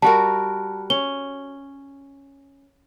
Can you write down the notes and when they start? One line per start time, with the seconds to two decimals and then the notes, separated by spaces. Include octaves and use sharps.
0.02 G3 F#4 A#4 A5
0.90 C#4 G7